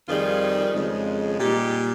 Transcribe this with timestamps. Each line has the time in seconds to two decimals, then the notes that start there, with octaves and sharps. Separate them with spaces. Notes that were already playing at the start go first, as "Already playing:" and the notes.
0.08 F2 D#3 G3 F4 G#4
0.74 F2 C#3 G#3
1.39 A#2 G3 D#4 G4